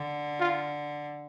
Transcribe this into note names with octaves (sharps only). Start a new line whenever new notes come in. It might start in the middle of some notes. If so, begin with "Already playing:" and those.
Already playing: D3
F4